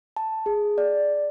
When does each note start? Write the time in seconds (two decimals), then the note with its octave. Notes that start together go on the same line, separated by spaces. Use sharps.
0.16 A5
0.46 G#4
0.78 D5